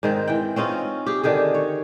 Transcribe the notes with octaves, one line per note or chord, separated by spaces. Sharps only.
G#2 D#3 C4
E3 G5
C4 C#4 D#4 F4
G4 G#4
D3 D#3 G4 G#4
C#5